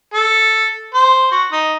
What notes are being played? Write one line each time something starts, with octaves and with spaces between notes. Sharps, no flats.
A4
C5
F#4
D#4